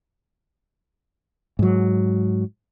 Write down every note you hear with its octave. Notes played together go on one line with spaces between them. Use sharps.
G#2 F#3